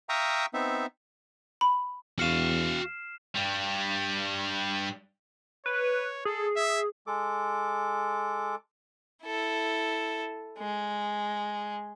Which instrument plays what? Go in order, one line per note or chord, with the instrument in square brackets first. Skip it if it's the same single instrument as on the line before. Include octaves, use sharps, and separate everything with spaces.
[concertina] E5 F5 G5 A#5 C#6 D#6
B3 C4 D#4 E5
[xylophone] B5
[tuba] E2 [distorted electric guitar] F#4 F5 [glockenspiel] F6 C7 E7
[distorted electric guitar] G2 G3
[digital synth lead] B4 [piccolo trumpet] C#5
[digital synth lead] G#4 [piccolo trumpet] A4
[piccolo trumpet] E5
[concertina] G#3 A4 D6
[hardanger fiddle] E4 A4
G#3